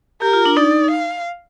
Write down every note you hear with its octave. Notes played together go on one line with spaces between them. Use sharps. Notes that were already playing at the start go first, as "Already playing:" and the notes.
G4 A#4
F4
D4
D#4 D5
F5